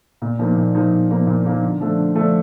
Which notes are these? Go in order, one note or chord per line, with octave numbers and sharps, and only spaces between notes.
A#2
F3 A#3 D#4
A#2
F3 A#3 D#4
A#2
F3 A#3 D#4
A#2
F3 A#3 D#4
D3
F3 A3 D4
D3
F3 A3 D4